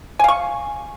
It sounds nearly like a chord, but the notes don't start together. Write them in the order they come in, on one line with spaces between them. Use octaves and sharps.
G#5 F5 C#6